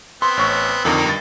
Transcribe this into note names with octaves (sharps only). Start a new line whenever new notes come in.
B3 C4 C6
A1 C#5 C#6
F2 D3 D#3 A#3 D#4
G2 A6